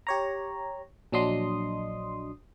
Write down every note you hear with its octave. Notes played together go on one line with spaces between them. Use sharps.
G4 C#5 A#5
A#1 F#3 D4 D#5 C6 D#6